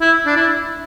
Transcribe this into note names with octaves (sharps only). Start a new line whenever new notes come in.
E4
D4
E4